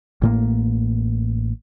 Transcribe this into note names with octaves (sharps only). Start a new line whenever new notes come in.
A1 A2 A#3